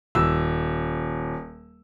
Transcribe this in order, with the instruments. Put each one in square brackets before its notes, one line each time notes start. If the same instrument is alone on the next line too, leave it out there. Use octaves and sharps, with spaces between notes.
[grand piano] D#1 E6